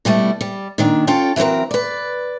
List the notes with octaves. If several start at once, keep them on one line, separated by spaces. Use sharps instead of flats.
B2 G3 A3 E4
G3
A#2 D#3 D4
C#4 F4 A4 G5
E3 F#3 A#3 C4 A#4
B4 D5